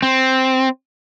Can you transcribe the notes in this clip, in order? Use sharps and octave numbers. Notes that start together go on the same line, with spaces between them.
C4